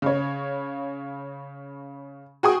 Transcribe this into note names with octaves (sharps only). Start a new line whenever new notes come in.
C#3 C#5
F#4 G#4 G5 C#6 D#6